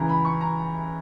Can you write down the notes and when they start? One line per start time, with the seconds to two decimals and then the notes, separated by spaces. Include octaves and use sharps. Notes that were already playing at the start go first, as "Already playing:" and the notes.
Already playing: C#2 C#3 E3 A#5
0.09 B5
0.25 C#6
0.41 A#5